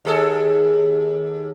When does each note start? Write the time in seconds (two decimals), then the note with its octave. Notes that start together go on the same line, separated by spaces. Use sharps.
0.05 D#2 G#4 A4